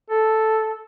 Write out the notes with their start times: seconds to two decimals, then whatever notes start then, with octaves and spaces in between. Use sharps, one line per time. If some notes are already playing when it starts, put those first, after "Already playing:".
0.10 A4